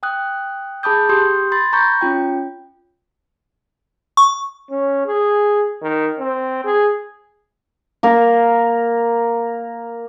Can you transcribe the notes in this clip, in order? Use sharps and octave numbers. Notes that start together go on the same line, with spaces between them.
G5 D#6 F#6
G#4 A5 B5 D6 D#6 G6
G4 C6 D#6 G6
B5 C6 A6
A#5 B5 C#6 G6
C#4 F4 G5
C#6
C#4
G#4
D#3
C4
G#4
A#3 A#4